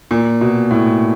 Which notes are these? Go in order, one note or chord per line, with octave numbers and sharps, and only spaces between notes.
A#2
B2
A2